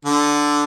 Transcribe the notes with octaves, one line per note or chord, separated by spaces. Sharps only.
D3